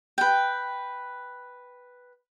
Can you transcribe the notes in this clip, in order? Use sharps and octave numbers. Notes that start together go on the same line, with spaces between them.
B4 G5